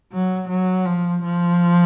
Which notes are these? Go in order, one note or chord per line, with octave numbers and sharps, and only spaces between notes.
F#3
F#3
F3
F3